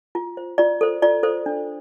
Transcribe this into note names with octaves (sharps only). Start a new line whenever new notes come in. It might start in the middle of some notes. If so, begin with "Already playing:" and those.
F4
C5
F4 D5
A4 C5
F4 D5
A4 C5
D4